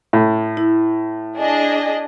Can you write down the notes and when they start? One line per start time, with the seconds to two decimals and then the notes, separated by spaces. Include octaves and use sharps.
0.13 A2
0.57 E4
1.37 D4 G#4 D#5